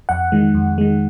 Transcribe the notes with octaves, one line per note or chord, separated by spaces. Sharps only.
F2 F#5
D#3 G#3
F2
D#3 G#3